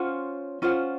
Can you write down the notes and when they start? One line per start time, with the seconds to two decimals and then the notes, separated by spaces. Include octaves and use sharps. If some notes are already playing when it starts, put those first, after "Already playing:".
Already playing: C#4 F4 C5 F#5
0.62 C#4 F4 C5 F#5